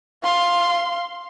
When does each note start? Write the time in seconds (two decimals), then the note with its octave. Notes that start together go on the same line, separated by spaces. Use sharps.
0.23 F5 C6